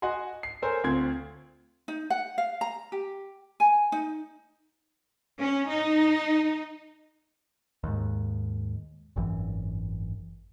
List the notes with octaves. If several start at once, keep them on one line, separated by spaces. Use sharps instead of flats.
F#4 D#5 F#5 G#5 C6
C7
A4 A#4 C5 C#5 G#5
D2 C4 F4 C6 G#6
D#4
F#5
F5
A#5
G4
G#5
D#4
C#4
D#4
D#2 G#2
G#1 F#2 E3